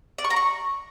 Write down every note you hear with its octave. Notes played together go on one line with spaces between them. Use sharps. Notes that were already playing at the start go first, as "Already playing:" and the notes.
D5
C#6
A#5
C#6